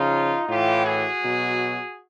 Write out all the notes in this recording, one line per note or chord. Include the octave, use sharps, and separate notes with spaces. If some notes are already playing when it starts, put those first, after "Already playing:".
Already playing: C#3 F3 D#4 F4
A2 E3 F4 G4
F#4 G#4
B2 F#3